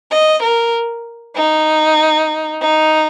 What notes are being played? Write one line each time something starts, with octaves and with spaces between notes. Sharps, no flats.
D#5
A#4
D#4
D#4